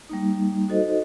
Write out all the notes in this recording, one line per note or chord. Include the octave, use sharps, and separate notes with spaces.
G3 A#3 D#4
D#4 F#4 A4 C5 D#5